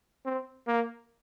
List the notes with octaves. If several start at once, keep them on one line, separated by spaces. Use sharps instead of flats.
C4
A#3